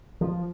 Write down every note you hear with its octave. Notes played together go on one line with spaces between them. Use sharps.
F3